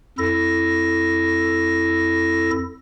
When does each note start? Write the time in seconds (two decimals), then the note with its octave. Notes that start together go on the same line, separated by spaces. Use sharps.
0.18 F2 E4 A4 A#6